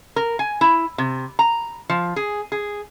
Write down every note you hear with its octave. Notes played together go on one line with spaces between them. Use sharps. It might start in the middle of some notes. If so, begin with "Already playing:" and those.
A#4
G#5
E4
C3
A#5
F3
G#4
G#4